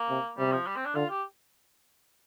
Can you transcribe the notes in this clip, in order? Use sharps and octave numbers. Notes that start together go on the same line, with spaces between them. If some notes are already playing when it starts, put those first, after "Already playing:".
Already playing: A#3
C3
C3 G3
F3
G3
C4
D4
D3 F4
G4